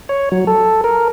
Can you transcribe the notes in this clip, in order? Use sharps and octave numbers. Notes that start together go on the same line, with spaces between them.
C#5
F#3
A4
A#4